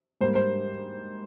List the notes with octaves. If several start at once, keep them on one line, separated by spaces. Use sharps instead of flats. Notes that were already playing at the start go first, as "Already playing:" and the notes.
G#2 G3 A#3 C5
C5